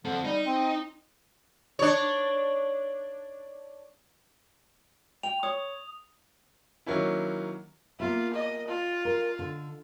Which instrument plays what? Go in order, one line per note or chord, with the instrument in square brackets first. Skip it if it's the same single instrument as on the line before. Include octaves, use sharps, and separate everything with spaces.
[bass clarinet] D3 [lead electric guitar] C4 A4
[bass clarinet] G3 [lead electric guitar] D#4
[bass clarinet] C4
[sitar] D4 C#5
[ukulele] G5 [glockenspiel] F7
[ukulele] C#5 [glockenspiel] D#6
[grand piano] D#3 F#3 A#3 C#4 E4
[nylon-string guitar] A#3 B3 E5 [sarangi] F4
[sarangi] D#5
F4
[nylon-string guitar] A#4
D3